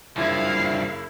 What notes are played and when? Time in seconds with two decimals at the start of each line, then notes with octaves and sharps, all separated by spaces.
0.17 F#1 G2 F3 E4 F5 G#6